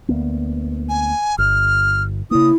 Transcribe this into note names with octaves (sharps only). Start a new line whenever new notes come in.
D2 A#3 B3
G#5
G1 F6
C#3 A#3 E4 D#6